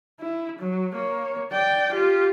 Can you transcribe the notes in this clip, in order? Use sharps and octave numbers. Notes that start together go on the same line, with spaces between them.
E4
F#3
A#3 C#5
D5 G5
F4 G4